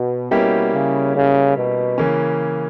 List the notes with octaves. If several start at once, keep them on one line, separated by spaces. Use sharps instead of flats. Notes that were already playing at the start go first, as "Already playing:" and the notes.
Already playing: B2
B2 G3 A#3 C#4 E4 G4
C#3
C#3
B2
C#3 E3 A#3 C#4